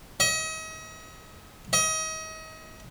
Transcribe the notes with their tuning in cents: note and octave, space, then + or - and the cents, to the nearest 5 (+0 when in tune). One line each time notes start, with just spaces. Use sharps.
D#5 +40
D#5 +35